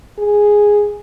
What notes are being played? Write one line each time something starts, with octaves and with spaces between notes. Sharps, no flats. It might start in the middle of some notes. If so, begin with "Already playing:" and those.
G#4